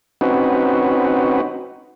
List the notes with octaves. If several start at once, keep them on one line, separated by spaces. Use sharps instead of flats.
C4 C#4 D#4 F#4 B4